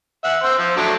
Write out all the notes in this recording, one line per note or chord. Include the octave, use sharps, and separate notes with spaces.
E5 F#5
C5 E6
F3
F#3 A3 D4